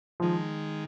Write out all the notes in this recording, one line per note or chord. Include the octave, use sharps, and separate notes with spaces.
D#3 F3 G#3